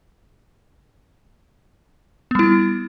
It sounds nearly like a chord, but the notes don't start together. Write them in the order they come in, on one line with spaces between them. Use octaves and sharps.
B3 G3 E4